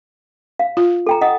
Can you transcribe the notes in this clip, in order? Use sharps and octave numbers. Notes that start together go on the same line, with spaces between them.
F5
F4
A4 G5 A#5
D#5 F#5 D#6